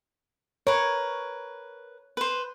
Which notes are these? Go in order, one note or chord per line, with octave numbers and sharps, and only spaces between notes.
A#4 B4 C#5
B4 C5